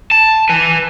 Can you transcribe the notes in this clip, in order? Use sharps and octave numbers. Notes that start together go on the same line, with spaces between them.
A5
B4 G#5